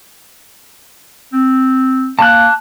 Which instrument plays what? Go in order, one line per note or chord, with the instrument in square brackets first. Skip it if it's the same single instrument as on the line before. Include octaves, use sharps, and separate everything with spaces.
[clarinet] C4
[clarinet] A#3 [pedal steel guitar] A5 F#6